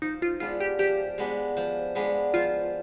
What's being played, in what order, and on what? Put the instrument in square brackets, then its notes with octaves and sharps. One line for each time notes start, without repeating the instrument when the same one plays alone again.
[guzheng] F3 [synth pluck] D#4
[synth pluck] F4
[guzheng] G#3 B3 D4 [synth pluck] F4
[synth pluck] G4
[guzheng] F3 [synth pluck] G4
[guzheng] G#3 B3 D4
F3
G#3 B3 D4
[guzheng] F3 [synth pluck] F4